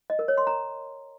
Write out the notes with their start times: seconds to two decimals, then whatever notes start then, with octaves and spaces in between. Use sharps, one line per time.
0.10 D#5
0.19 A#4
0.28 C#5
0.37 C6
0.47 A#5